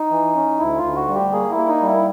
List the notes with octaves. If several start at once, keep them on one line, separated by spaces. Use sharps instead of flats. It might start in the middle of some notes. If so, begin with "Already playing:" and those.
Already playing: D#4
E3
C#4
D2 E4
F4
D2
F#4
G3
G4
A#3 G#4
E4
A#3
D#4
G3
E4